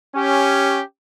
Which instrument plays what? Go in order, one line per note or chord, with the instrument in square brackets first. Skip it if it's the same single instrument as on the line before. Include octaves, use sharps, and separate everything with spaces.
[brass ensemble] C#4 G4